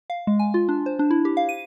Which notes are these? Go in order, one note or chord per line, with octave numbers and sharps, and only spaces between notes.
F5
G#3
G#5
F4
D4
C5
D4
E4
G4
F5
D#7